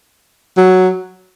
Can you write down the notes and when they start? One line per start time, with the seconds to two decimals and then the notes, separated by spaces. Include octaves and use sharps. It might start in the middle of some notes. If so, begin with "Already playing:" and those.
0.58 F#3